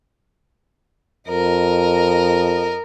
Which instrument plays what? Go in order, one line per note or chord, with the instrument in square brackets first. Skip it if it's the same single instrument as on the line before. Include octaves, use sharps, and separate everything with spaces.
[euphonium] F2 [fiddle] A#4 D#5